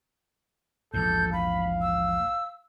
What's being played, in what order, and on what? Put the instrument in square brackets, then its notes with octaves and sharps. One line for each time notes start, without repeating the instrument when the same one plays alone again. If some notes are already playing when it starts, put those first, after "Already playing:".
[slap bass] A#1 E2 G#2 [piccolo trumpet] A4 [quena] G6
[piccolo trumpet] F5 [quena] B5
[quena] E6